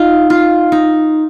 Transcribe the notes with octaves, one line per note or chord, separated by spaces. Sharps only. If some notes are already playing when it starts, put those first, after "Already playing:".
Already playing: D#4 F4
F4
D#4